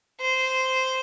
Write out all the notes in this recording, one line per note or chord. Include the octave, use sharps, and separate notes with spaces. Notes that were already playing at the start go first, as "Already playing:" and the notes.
C5